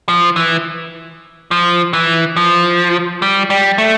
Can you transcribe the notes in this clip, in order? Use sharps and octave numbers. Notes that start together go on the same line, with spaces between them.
F3
E3
F3
E3
F3
G3
G3
A3